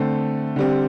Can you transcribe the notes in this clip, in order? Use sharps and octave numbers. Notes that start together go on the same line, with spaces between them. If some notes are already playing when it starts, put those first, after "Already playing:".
Already playing: D3 A3 C4
D3 G3 C4